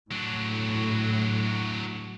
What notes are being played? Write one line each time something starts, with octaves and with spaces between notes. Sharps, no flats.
A2 F#3 D4